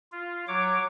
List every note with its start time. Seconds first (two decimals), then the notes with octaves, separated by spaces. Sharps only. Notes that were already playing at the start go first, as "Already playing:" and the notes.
0.12 F4
0.48 F#3 C#5 D6